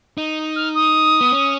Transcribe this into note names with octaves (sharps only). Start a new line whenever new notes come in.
D#4
F6
D#6
B3
C#4